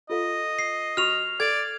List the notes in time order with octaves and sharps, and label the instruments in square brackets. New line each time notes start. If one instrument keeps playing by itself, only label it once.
[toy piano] F4 A4 F5 [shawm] D#5
[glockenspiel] C7
[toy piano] F#4 F#5 C#6 [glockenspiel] F6 F7
[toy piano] A4 F#5 [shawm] D5 [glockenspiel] G#6